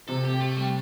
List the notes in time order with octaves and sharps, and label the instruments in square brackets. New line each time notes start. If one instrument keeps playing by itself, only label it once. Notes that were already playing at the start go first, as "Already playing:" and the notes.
[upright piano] C3 [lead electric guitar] A4
[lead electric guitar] G4
A3
G3